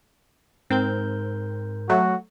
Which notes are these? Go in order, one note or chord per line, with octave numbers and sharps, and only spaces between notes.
G#2 C4 A#4 G6
F#3 A3 F#4